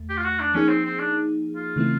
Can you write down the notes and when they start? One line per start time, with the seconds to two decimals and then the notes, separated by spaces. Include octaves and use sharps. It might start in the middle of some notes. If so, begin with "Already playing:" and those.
Already playing: E2 A3
0.09 G4
0.18 F4
0.24 F#4
0.40 D4
0.54 F3 A#3 C#4 D#4 G#4
0.69 C4
0.85 C4
0.99 D4
1.56 F4
1.76 C#3 E3 A3 C4 E4